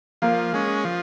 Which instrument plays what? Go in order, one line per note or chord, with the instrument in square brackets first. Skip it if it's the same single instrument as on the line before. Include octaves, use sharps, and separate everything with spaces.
[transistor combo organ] F3 [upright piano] A#3
[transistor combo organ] G#3 C#4
F3